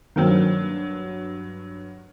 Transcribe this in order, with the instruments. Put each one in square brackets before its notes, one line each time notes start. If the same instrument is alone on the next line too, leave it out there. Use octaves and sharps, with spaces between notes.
[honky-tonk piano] G2 F#3 [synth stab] D#3 A#3 C4